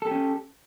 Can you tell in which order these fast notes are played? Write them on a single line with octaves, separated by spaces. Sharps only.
A4 G4 C#4